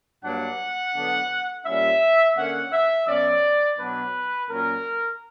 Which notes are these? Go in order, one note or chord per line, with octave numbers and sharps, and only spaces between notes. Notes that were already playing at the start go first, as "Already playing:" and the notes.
G2 F#3 A#3 D4 F#5
D3 F#3 B3 D4
A#2 G3 C#4 E5
D3 A#3 C#4 F#5
E5
B2 F#3 C#4 D5
B2 F#3 B3 D4 B4
A#2 F#3 C#4 A#4